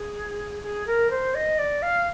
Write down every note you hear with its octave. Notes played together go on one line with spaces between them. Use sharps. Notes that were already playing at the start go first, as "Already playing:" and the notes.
Already playing: G#4
G#4
A#4
C5
D#5
D5
F5